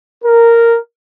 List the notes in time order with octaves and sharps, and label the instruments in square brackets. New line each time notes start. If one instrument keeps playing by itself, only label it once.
[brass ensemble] A#4